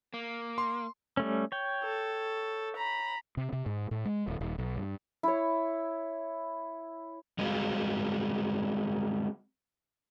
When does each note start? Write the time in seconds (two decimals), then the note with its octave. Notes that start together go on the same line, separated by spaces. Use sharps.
0.14 A#3
0.58 C6
1.17 G3 A3 C#4
1.52 C#5 G5
1.84 A4
2.76 A#5 B5
3.37 C3
3.53 C3
3.66 G#2
3.91 A2
4.05 G#3
4.28 D1
4.41 D#1
4.58 B1
4.77 G2
5.23 E4 C#5
7.38 G3 G#3 C4 F#4 G#4 F5